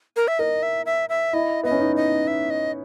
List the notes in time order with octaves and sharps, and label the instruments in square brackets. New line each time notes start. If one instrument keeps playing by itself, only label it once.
[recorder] A#4
E5
[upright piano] A#4 [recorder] D#5
[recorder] E5
E5
E5
[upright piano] E4 [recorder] D#5
[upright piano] B3 [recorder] D#5
[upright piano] C#4
D#4
[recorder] D#5
E5
D#5